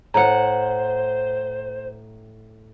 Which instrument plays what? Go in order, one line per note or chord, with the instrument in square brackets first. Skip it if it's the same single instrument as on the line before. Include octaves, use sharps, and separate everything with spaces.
[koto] A2 F#5 [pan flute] C5 [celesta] A#5